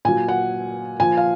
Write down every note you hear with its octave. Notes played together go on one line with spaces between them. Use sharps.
A#2 F#3 G#5
F#5
A#2 F3 G#5
F5